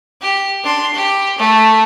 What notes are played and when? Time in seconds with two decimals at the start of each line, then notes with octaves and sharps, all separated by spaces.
0.21 G4
0.64 D4 C6
0.94 G4
1.38 A3